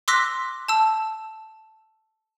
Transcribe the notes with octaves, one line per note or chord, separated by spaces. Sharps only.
C6 D6 E6 F#6 A#6 B6
A5 E6